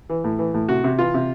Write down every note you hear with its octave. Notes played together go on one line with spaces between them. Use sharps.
E3
A2
E3
A2
C3 F#4
C3
E3 F4
C3